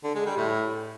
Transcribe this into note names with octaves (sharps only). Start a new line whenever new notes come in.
D3
G#3
G3
A2